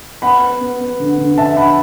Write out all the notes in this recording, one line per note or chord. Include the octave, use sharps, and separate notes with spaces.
B3 F#5 B5
B3
B3
B3
D3
D3
D3 E5 A5
D3 F#5 B5